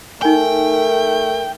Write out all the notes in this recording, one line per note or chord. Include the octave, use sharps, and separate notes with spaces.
A3 D#4 A#4 G5 G#5